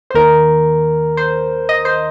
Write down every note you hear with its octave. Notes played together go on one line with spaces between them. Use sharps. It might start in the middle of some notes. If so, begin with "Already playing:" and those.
C5
D#2 D#3 A#4
C5
D#5
C5